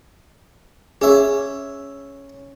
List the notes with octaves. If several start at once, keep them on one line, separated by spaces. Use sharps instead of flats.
C#4 G#4 E5